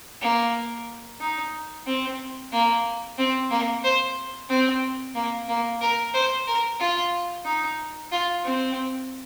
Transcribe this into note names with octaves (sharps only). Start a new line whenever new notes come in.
A#3
D#4
C4
A#3
C4
A#3
C5
C4
A#3
A#3
A#4
C5
A#4
F4
D#4
F4
C4